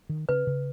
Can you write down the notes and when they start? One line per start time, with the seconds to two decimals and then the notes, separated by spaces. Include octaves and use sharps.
0.09 D#3
0.29 C#3 B4
0.47 C#3